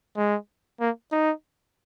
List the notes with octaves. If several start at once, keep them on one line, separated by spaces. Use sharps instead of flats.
G#3
A#3
D#4